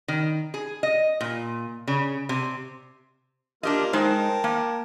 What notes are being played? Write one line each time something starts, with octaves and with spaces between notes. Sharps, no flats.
D#3
G#4
D#5
A#2
C#3
C3
A#3 D4 F4 G4 D#5
G#3 D#4 A#4 C5 G5 A5
A#3